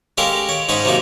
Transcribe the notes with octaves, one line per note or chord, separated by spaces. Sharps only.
G#3 C#4 G4 A4 A#4 F5
C#5 D6
G#2 C#4 D#4 B5 C#6 D#6
C3 F#3 A#3 D#4